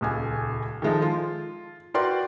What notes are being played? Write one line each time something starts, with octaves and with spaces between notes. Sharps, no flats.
D#1 C#2 G#5
D#3 F3 G#3 D#4 A4
F4
F#4 A#4 B4 D5 G5 C6